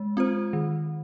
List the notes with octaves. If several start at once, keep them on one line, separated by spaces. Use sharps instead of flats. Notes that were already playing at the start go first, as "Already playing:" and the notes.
Already playing: G#3
C4 F4 C5
D#3